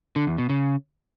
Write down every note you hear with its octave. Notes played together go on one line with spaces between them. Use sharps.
D3
E2
B2
C#3